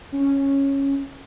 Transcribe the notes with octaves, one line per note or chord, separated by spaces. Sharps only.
C#4